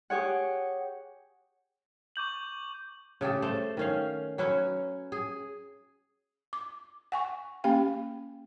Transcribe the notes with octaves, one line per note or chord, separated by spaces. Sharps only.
G4 G#4 C#5 F#5
C#6 D6 G6 F#7
C#3 A3 G4 A4
A3 C5
D#3 C#4 F5
F#3 C#4 B4 C#5
G#4
D6
F#5 G#5 C#6
A#3 C#4 G4 F5 G5